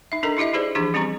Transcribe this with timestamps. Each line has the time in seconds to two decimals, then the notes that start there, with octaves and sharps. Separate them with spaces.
0.12 D#4 E5
0.23 D4 D#4 A4 A#4 D#5 A#5
0.37 D#4 E4 G4 D#5 E5
0.53 D#4 G4 G#4 B4 C5 D5
0.75 E3 F3 D4 G4 G#4
0.94 G3 C4 C#4 G4 A#5 C#6